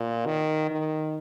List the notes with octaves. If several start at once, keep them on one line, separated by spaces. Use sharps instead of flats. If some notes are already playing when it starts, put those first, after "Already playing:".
Already playing: A#2
D#3
D#3